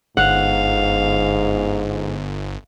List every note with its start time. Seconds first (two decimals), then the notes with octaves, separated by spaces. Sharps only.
0.17 G1 G#2 F5 F#5